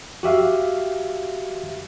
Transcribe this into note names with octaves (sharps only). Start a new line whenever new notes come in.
F#4 G4 E5 F5